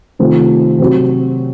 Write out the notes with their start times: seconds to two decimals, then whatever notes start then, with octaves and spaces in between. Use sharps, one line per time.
0.19 C3 D#3 A3 C4 F4
0.80 C3 F#3 C4 F#4